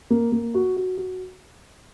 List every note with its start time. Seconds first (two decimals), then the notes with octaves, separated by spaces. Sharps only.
0.10 A#3
0.32 A#3
0.54 F#4
0.77 F#4
0.97 F#4